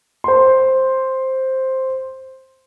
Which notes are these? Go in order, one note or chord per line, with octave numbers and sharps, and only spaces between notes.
C5 C6